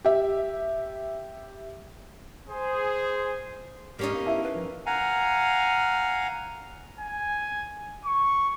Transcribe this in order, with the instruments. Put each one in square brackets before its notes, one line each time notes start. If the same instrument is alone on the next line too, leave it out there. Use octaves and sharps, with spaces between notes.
[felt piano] G4 E5
[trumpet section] G#4 C5
[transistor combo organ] G#2 D5 F6 [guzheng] A#3 C#4 D#4 [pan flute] G4
[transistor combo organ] B3 A#4 F5
[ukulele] E4 E5 A5
[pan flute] B4
[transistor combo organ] F3
[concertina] F5 F#5 G#5 A#5
[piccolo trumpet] G#5
C#6